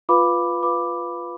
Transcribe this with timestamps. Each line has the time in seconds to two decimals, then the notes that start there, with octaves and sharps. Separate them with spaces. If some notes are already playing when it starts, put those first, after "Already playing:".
0.09 F4 B4 F5 B5 D6
0.63 F4 B4 F5 B5 D6